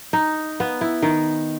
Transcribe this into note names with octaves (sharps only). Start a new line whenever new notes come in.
D#4
B3
E4
D#3